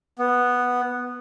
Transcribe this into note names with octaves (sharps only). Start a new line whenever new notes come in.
B3